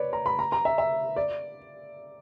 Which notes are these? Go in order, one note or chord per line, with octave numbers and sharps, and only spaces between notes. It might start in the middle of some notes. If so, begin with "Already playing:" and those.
Already playing: B4 C#5 D5
A#5
B5
A#5
A#5
E5
E5
D5